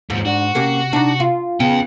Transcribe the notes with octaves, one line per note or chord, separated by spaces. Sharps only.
D#2 G#2 F3 C#7
D4 F#4
C3 A#3 C#4 G4
D4 D#4
F4
C#3 B3 F5 G5